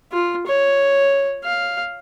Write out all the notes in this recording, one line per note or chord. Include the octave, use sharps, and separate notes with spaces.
F4
C#5
F5